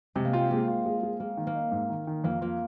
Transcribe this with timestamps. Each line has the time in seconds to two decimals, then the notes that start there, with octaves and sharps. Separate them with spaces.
0.15 C3 G#3
0.25 A#3
0.33 C4 F4
0.51 G#3 A#3
0.68 F4
0.86 G#3
1.03 G#3
1.20 G#3 A#3
1.37 D#3
1.47 A#3
1.55 D#4
1.72 G#2
1.90 D#3
2.07 D#3
2.24 F2 A#3
2.41 A#3 F4